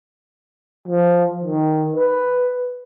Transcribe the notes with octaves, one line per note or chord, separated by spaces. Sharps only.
F3
D#3
B4